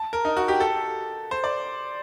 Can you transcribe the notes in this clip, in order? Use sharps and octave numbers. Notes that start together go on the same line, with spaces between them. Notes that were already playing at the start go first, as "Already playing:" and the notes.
Already playing: A5
A#4
D#4
F#4
G4
A4
C5
D5